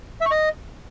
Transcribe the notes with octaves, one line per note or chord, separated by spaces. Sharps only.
E5
C#6
D#5